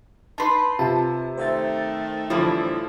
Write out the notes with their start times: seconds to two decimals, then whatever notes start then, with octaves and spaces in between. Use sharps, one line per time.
0.38 D#4 B4 A5 C6 C7
0.79 C3 F4 A5
1.37 D#3 A3 C5 E5 A6
2.30 A2 D3 E3 F3 G3 E4